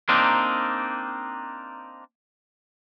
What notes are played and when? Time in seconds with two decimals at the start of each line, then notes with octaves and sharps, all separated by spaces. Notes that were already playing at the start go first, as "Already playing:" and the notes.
0.09 A#3 C4 D4 D#4